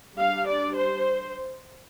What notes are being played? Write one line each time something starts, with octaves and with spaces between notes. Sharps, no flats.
G3 D4 F5
D5
C5